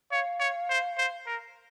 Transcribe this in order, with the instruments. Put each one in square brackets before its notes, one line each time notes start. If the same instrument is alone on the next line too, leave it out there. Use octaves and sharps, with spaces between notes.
[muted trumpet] C#5 [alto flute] F5
[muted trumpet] C#5
C5
C5
A#4